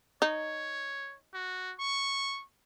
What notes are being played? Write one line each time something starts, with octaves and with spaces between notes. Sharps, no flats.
D#4 C#5
F#4
C#6